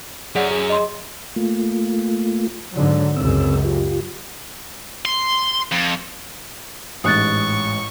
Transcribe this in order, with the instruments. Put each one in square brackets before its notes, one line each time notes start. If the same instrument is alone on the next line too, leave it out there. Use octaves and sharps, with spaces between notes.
[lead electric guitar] F#2 [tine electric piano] G#4 D5 F#5
[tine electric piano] G#4
[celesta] D#5 C6
[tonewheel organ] A3 A#3 F4
[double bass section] G#2 D3 F#3
[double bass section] C#2 F#2 [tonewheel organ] C4 E6
[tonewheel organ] F4 G4
[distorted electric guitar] C6
F2
[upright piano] A1 G#2 [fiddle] C#6 [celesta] D#6 F#6 A6